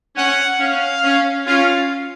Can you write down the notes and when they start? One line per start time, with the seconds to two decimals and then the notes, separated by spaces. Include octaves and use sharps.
0.17 C#4 F#5
0.61 C#4 F5
1.04 C#4
1.47 C#4 F4 F5